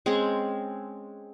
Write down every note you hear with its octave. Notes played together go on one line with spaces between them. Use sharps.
G#3 C4 C#4 G#4